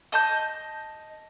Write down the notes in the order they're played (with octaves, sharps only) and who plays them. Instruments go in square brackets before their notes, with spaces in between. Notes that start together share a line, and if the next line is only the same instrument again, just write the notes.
[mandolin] D#5 A5 G6